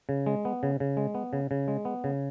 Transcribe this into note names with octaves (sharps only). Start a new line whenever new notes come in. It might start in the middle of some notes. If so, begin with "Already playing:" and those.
C#3
G#3
B3
C#3
C#3
G#3
B3
C#3
C#3
G#3
B3
C#3